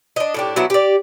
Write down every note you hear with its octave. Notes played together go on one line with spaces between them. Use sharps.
D4 D#5
A2 D4 G4
F#3 B3 D4 E4
G4 D5